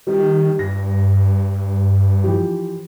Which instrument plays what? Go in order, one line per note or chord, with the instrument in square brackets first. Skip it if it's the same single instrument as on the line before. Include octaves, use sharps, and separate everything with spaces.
[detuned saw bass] D#3 [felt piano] G3 G4
[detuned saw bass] G2 [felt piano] A#6
[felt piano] E3 F3 G4